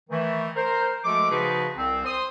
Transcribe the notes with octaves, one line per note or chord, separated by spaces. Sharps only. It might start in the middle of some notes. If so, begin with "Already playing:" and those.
D#3 E3 A3
A#4 C5
F3 G#3 A3 F#4 A4 D6
C#3 F3 D#4 F#4 G#4 B4
C2 C4
C5 C6 D#6